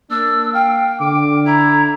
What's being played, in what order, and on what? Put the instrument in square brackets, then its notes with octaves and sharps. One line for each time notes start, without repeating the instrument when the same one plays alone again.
[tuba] A#3 [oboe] D4 [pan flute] E6
[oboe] F5 [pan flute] G5
[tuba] D3 [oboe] D6
[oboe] E4 [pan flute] A#5